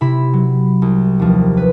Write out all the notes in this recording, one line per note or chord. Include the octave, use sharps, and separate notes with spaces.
C3 E4 B5
F#3
C2
D#2 F3
B4